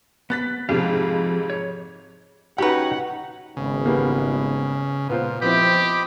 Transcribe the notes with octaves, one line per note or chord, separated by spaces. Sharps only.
B3 F#6 A6 B6
F2 G#2 C3 F3 C4 F5
C#5
C#4 D#4 F#4 G4 B4 F#5 G5
G#1 C#3 B3
E3 G3 A#3
A#2 B3 F4 C5
F3 B3 C4 E4 G4 D#5 B5 D6